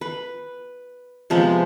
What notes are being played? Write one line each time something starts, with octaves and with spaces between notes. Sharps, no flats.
B4
C3 F3 G#3 B3